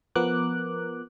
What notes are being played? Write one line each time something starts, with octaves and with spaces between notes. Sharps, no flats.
F3 B3 A#4 D6 F#6